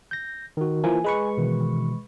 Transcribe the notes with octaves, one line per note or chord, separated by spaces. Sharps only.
G6 A#6
D#3 F#4
E3 F3 A#3 G#5
G#3 B4 C#6
B2 D#3 E3